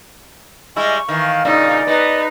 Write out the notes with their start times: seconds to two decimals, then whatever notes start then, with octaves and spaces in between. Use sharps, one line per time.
0.76 G3 G#3 E4 D#5 G#5 C#6
1.09 D#3 E3 F5
1.45 G2 A#2 C#3 D#4 D5
1.87 B3 D#4 B4 D#5